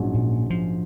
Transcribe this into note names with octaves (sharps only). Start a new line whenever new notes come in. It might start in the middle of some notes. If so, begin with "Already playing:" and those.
Already playing: A#1 G#2 F#3 C#4
A#2
F3